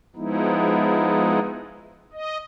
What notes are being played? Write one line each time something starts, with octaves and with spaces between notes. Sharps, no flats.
F3 G#3 B3 D#4 E4
D#5